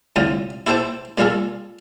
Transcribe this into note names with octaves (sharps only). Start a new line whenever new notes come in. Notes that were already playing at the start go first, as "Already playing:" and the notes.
C2 A2 D3 F4 D#6
E4 G4 A4 C5 G5 A5
A#2 G3 A#3 F4 G#4 A4